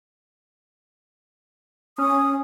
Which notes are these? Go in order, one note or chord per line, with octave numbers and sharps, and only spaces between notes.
C#4 D#6